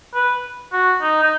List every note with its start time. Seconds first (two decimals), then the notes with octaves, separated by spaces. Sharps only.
0.14 B4
0.72 F#4
1.02 D#4
1.23 D#4